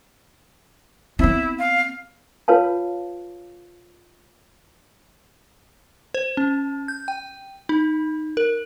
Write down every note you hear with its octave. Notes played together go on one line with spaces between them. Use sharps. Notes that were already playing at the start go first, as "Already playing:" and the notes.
B3 C4 E4
F5
F4 B4 C#5 F5 A5
C5
C#4
G6
G5
D#4
A#4